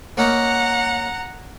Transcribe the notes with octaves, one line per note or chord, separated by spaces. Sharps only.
A#3 C#4 D#4 F#5 A#5